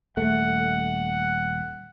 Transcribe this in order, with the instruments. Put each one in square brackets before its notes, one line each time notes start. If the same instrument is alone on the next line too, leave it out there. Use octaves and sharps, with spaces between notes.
[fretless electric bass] D#1 A3 [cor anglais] F#5